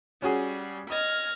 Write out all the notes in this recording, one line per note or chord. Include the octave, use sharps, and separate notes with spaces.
G3 C#4 F#4 G#4
D#5 F6 G#6 A#6